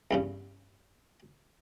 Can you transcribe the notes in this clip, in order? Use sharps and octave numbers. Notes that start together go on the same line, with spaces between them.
E2 G2 C#3